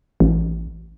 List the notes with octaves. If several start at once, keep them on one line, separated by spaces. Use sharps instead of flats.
A1